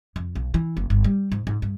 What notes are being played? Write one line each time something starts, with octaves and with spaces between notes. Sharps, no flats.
F2
B1
E3
F#1
G1
G3
G#2
G#2
G2